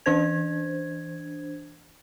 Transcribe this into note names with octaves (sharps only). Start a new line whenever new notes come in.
E3 D4 C5 G#6